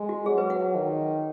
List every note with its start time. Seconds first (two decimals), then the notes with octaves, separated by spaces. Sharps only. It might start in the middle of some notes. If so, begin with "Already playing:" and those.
Already playing: G#3
0.09 F#4
0.26 F#3 G#4
0.38 B4
0.50 F#5
0.75 D#3